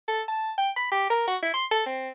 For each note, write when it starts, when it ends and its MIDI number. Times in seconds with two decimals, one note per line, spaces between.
0.08 0.22 69
0.28 0.52 81
0.58 0.70 79
0.76 0.88 83
0.92 1.06 67
1.10 1.26 70
1.27 1.37 66
1.43 1.50 64
1.54 1.65 84
1.71 1.85 69
1.86 2.09 60